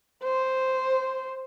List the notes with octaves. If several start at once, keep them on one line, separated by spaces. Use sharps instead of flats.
C5